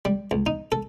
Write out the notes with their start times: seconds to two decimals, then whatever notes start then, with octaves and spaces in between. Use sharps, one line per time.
0.05 G3
0.31 C#2
0.46 D#4
0.72 A4